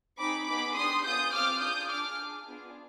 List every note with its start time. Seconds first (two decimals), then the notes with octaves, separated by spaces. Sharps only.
0.19 C4 D#4 G#4 B5 D6
0.47 B3 D#4 G#4 B5 D6
0.76 D4 G4 C6 D#6
1.04 B3 F4 G#4 D#6 G6
1.33 C4 F4 G#4 D6 F6
1.61 D4 F4 G#4 D#6 G6
1.90 D4 G#4 D6 F6
2.19 D4 G#4
2.47 B3 D4 F4 G#4